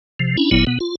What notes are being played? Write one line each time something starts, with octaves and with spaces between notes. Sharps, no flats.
C3 F3
C#4 D4 E4
G1 A#2 F#3 B3 E4
B2 B3
F4